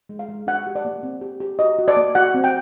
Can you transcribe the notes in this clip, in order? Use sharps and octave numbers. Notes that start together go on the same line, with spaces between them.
G#3
F5
G#3
D4 F#5
G4
D5
A#3
C4
G4
G4
F#4 D#5
F#4
D5
A#3
F#4 F#5
C4
G5